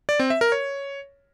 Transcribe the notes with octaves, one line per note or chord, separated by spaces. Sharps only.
D5
C4
E5
A#4
C#5